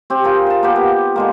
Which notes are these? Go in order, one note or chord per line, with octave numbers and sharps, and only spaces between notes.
C4 G4
F4 G#4 A#4 G5
G#4 A5
A#3 B3 G4
B3
D3 G#3 A#3